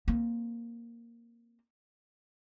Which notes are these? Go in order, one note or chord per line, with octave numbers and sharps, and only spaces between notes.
A#3 C4